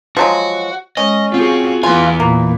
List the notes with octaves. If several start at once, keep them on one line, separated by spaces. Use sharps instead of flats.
F3 F#3 G#3 F#4
G#3 C#4 D#5
C4 F4 F#4 G#4
E2 E3 B3 F4 G#5
A#2 A#3